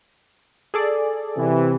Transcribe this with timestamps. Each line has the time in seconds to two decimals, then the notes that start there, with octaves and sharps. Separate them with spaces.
0.74 G#4 A4 D5
1.38 C3 E3